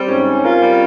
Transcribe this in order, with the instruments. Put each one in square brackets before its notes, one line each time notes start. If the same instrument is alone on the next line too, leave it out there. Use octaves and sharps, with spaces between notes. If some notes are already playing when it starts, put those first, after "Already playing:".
Already playing: [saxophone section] G3 [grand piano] C4
[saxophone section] G#2 [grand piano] C#4
[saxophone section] C#4
[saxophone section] F4 [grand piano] A#4
[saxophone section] G3